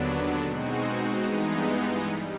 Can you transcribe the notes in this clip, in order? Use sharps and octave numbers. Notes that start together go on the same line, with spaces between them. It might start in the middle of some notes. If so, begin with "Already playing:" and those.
Already playing: D#2 D3 F#3 B3 D4
B2 G#3 C4 D#4 F#4
G2 E3 G#3 B3 D#4
G3